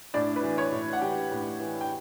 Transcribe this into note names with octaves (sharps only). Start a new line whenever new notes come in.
A2 D4 D5
B4
E3
C#5
A2
F#5
E3 G4 G5
A2
E3
G5